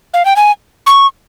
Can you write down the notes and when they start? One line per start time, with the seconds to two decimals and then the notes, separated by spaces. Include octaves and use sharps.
0.14 F5
0.25 G5
0.36 G#5
0.87 C#6